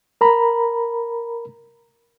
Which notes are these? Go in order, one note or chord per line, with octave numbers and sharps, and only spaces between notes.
A#4 A#5 B5